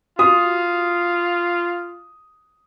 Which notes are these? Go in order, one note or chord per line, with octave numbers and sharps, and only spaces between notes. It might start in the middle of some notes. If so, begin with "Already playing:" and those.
F4 F#4 D#6